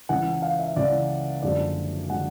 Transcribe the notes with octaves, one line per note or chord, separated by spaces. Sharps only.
C#2 C#3 E3 F#5
F5
E5
C#2 C#3 E3 D5
F#1 F#2 D3 F3 G#3 D5
D3 F3 G#3 F#5